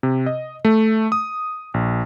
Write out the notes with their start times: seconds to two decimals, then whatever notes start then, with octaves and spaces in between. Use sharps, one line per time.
0.03 C3
0.26 D#5
0.65 A3
1.12 D#6
1.74 A#1